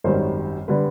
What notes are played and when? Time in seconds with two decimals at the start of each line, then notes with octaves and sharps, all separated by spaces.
0.04 G#1 F#2 D#3 G3 A#4 C5
0.68 D3 G3 B4